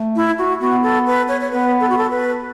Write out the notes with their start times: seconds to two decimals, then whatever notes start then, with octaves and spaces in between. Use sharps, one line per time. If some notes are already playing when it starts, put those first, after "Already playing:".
Already playing: A3
0.16 E4
0.38 F#4
0.61 B3 F#4
0.83 A4
1.07 B4
1.28 C#5
1.41 C#5
1.51 B3 B4
1.81 A4
1.90 F#4
1.98 A4
2.11 B4